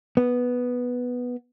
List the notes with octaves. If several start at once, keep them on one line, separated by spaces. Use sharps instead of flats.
B3